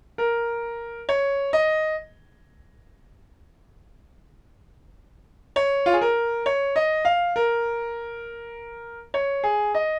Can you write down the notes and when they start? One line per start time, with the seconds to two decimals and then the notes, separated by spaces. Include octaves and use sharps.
0.18 A#4
1.09 C#5
1.53 D#5
5.56 C#5
5.86 F4
5.93 G#4
6.01 A#4
6.46 C#5
6.76 D#5
7.05 F5
7.36 A#4
9.14 C#5
9.44 G#4
9.75 D#5